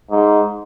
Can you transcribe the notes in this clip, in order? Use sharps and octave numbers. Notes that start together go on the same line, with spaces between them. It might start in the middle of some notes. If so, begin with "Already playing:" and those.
G#2